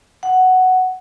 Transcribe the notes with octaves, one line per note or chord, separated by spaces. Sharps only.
F#5